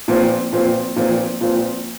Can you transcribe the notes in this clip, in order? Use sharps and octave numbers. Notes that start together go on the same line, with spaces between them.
A#2 F3 C4
A#2 F3 C4
A#2 F3 C4
A#2 F3 C4